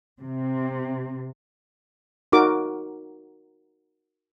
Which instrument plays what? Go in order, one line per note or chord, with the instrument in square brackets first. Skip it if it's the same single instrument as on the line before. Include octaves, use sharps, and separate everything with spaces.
[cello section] C3
[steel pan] D#4 F#4 A#4 D6